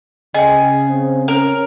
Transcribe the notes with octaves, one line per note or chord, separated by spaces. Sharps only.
C#3 G#4 D#5 G5
C4
C#4 A#4